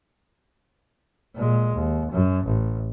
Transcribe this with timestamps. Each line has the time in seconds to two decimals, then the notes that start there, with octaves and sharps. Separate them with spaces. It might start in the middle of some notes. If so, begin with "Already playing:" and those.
1.35 A#2 G#3
1.75 D#2
2.12 F#2
2.46 A1